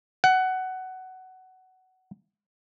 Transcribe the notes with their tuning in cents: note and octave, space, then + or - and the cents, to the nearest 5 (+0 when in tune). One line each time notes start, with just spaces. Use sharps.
F#5 +15